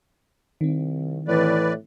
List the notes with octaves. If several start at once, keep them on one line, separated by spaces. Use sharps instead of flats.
C2 D#3 C4
A2 E3 B4 D5